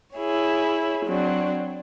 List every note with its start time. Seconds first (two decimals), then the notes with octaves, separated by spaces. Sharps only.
0.16 E4 G#4 C#5
1.06 F#3 C4 D4 F#4